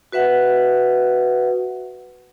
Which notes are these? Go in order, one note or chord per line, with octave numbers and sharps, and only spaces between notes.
F#4 B4 E5 F#5